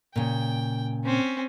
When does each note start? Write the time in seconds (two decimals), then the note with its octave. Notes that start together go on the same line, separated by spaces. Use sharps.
0.16 A#2 C#3 G5
1.06 C4 C#4